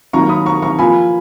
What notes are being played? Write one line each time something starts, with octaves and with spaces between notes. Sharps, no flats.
D#3 F#3 A#3 A#5 C#6
B5 D#6
A#5 C#6
A#5 C#6
F3 A#3 F4 G#5 B5